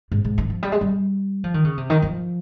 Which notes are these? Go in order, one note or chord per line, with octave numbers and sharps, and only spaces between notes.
G#2
G#2
D#3
F3
G3
G#3
G3
F3
D#3
C#3
C3
D#3
F3